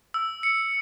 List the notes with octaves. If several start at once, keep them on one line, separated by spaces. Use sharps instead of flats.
E6
C#7